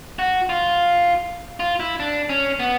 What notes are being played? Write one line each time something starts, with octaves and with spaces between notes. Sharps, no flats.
F#4
F4
F4
E4
D4
C#4
B3